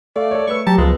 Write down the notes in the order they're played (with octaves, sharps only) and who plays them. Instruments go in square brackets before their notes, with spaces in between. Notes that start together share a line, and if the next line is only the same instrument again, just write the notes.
[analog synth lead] A3 [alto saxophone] D5 [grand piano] F5
[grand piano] A4 C#5
[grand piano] A3 B4 E6 [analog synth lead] C#6
[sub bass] F#3 [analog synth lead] G4 [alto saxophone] A5 [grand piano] A#5
[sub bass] C#2 [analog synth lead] F3 [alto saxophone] G#3 [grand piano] B3 B4